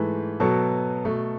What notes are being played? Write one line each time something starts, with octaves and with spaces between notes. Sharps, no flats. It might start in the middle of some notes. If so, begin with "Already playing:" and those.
Already playing: G#2 E3 A3 B4
B2 F#3 B3 A4
B2 A3